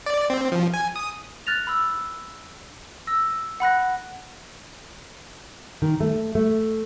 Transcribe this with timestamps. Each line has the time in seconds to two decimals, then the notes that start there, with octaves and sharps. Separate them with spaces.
0.06 D5
0.30 C4
0.52 F3
0.74 G#5
0.96 D#6
1.47 F6 F#6 A6 A#6 F7
1.67 B5 E6
3.07 E6 A#6
3.60 F#5 B5 F#6 A#6
5.82 D#3
6.01 A3
6.35 A3